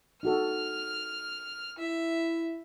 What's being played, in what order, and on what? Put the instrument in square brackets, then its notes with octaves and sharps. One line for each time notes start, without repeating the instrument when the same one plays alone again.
[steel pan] D#4 F#4 A4 [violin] F6
[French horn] E4 [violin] E5